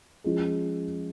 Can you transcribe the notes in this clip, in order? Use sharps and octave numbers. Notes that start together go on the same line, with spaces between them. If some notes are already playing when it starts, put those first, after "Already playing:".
F3 G#3 C#4 F4 G#4